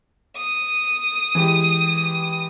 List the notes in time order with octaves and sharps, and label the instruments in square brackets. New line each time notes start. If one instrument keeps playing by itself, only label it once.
[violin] D#6
[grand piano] E3 G#3 G4